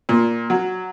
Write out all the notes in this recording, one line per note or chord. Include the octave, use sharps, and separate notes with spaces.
A#2
F#3